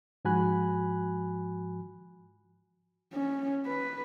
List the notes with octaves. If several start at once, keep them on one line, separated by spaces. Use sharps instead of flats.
G#2 F3 F#4 G#5 B5 F#6
C#4
B4